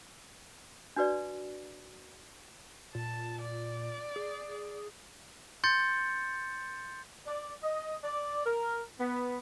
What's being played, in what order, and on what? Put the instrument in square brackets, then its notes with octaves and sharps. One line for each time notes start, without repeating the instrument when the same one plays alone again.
[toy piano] D4 F#4 B4 D5
[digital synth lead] A#2 [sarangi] A5
[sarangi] D5
[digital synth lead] G#4
[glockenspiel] C6 G6 A6 C#7
[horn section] D5
D#5
D5
A#4
B3